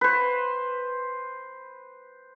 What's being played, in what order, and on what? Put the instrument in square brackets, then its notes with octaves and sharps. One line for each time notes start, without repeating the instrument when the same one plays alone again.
[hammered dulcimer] B4 C5